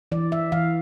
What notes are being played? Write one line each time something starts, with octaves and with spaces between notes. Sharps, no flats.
E3 D5
E5
E3 F5